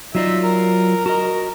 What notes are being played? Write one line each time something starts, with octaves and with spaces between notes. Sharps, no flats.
F#3 D#4 F4 D5 E5
A#4
F#4 A#4 D#5